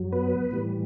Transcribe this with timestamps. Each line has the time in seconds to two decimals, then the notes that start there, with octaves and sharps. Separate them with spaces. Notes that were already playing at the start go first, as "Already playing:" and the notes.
Already playing: F#2 F#3
0.12 B3 B4
0.51 A2 E3 G3